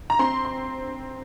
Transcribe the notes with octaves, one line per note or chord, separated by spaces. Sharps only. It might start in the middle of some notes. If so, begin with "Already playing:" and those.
A#5
C4 C6
C6